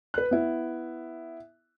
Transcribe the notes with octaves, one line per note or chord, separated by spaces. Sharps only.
B4 F#6
B3 E4